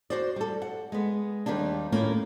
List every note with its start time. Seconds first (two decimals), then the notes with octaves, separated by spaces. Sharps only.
0.10 F#4 C5 D5
0.36 G3 A4
0.62 F#5
0.92 G#3 B3
1.46 D#2 D#3 G3 A#3 D4
1.92 A2 A#3 C#4 F4 A#4